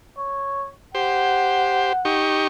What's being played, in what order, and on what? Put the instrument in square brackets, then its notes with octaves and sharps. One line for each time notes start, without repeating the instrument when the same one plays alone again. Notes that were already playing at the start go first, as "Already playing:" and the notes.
[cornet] C#5
[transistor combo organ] G4 C5 [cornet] F#5
[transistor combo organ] D#4 G4 C#6